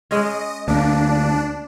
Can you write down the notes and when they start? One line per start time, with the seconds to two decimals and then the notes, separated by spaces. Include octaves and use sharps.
0.11 G#3 C#4 D#5
0.68 D2 A#3 D4